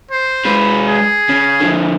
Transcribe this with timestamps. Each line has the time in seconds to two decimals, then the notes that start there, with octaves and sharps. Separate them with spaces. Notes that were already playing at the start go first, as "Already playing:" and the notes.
0.11 C5
0.45 G#3 B4
0.88 G#4
1.29 C#3
1.60 D3 F3